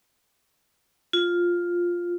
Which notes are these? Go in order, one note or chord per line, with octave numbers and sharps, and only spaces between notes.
F4